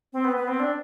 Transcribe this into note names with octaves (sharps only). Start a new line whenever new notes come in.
C4
B3
B3
C4
D4